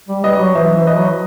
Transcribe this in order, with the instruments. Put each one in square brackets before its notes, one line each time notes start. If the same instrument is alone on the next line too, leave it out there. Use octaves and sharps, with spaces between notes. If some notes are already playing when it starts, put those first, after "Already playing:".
[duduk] G3
[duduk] G3 [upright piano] B4 D#5
[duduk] F#3
[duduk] E3 [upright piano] C5 E5
[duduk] E3
[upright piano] B4 D#5
[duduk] F#3